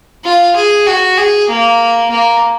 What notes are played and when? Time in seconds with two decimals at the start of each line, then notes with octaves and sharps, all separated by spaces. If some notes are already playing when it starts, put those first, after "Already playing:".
0.25 F4
0.56 G#4
0.87 F#4
1.17 G#4
1.49 A#3
2.10 A#3